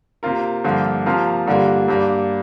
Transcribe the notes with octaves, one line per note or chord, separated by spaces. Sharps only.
C3 A#3 F4 A#4
G2 D3 F3 A#3 F4
C3 F3 A#3 F4 A#4
G2 D3 G3 A#3 F4
G2 G3 A#3 D4